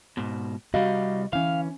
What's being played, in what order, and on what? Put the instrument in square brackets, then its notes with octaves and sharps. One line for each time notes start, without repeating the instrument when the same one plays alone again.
[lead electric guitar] G#2 B2
[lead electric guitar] C2 G3 [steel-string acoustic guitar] F#4 D#5 F5
[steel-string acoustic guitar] E3 C#4 [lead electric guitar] F5